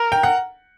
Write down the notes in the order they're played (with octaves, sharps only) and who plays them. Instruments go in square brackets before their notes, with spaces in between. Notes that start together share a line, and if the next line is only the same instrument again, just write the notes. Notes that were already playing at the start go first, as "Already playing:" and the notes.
Already playing: [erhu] A#4
[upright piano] G5
F#5